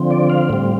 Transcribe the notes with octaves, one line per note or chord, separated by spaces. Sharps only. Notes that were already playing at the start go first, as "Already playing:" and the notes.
Already playing: D3 F3 C4
D5
F5
A2 G3 C4